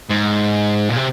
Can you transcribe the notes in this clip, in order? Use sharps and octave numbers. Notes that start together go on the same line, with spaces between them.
G#2
A#2
C3